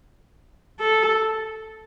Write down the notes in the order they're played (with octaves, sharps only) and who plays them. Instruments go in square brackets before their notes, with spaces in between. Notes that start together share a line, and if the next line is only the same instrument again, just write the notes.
[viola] A4